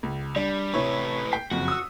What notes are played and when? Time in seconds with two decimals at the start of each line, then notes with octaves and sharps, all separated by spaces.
0.03 C#2
0.36 G3 D4
0.74 A2 C3 E4 B4 C#5
1.32 G5 B6 C7
1.51 F#1 F2 F#4
1.68 D#6 E6